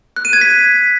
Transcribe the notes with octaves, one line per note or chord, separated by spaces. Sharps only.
F#6
D#7
G#6
B6